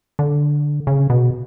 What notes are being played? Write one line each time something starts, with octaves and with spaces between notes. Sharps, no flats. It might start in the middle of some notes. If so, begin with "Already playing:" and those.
D3
C#3
B2